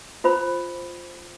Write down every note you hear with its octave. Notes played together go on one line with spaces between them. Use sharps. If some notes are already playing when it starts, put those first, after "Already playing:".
F4 C5 B5